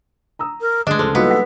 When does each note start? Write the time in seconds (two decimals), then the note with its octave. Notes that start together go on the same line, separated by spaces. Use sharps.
0.39 A#5 D#6 E6
0.61 A#4
0.87 D3 G#3 A3 D4 G#4 D#5
0.99 C#2 F3 A4 D6
1.15 F#3 G3 A#3 B3 D#4 F4 F#4 A4
1.31 F#5 B6